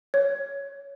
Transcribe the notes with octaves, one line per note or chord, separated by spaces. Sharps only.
C#5